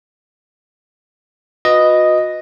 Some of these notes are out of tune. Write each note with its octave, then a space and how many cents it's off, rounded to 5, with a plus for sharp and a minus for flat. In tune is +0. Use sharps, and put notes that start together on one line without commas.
F#4 -40 B4 +0 D#5 +0